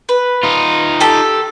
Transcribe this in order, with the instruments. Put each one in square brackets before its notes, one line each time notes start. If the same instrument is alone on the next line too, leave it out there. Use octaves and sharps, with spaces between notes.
[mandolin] B4
[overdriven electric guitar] D#4 F4
[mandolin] G4 A4